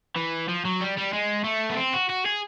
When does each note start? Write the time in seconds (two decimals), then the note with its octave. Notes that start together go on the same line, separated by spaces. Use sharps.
0.16 E3
0.49 F3
0.65 F#3
0.81 G3
0.97 G3
1.13 G#3
1.44 A3
1.70 B3
1.77 C4
1.93 F#4
2.09 F#4
2.25 G#4